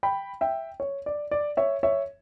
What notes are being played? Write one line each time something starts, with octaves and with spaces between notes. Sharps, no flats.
G5 B5
E5 G5
C#5
D5
D5
C#5 E5
C#5 E5